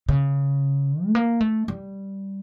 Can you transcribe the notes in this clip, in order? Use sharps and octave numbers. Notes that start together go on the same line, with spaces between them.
C#3
A3
A#3
A3
G3